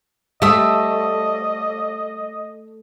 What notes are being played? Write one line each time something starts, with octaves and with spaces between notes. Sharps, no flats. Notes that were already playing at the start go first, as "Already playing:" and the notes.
G3 A3 D#5 E5 D#6